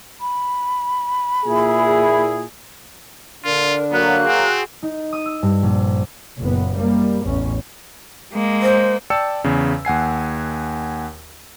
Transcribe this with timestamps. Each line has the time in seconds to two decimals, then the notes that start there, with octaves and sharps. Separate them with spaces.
0.21 B5
1.45 A#2 E4 G#4
3.44 D3 D4 F4 A#4
3.92 F#3 A#3 B3 F#6
4.24 C4 F#4 G#4
4.83 D#4
5.13 D#6
5.26 E6
5.43 G2
5.63 A#1
6.39 F#1 A#2 B3
6.77 G3 A#3
7.24 A1 E2 C#4
8.33 G#3 A#3
8.62 C5
9.10 D5 G5 A5 E6 C#7
9.44 E2 C#3
9.85 D#2 F#5 G#5 C7